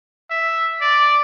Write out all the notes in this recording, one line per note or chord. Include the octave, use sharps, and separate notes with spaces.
E5
D5